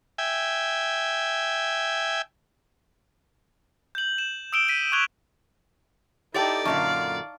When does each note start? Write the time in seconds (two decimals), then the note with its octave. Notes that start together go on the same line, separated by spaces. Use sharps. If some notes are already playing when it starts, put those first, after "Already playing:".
0.18 E5 G5 G#5
3.95 G6 F#7
4.18 E7
4.53 D#6 E6 D7 E7 G7
4.69 B6 D#7
4.92 C#6 D6 F#6 G#6 F7 G7
6.34 D#4 E4 G4 A4 D5 G5 A5 A6
6.65 F#2 A#2 D3 F5 A5 A#5 C#6